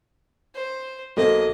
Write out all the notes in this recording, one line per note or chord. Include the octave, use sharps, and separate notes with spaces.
C5
B1 A#3 F#4 A4 C5 D#5